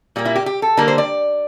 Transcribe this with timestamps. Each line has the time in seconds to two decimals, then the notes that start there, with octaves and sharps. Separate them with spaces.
0.16 A#2 G3 A#3
0.25 E4
0.36 G4
0.46 G4
0.62 A4
0.77 D3 G3 A#3 A#4
0.88 C5
0.98 D5